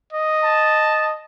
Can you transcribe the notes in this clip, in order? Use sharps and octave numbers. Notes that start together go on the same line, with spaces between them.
D#5
A5